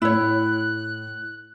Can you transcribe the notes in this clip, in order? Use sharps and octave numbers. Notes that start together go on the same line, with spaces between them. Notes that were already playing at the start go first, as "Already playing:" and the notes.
A2 E4 C#5 F#6